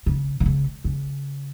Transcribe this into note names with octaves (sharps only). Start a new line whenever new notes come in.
C#3
D3
C#3
C#3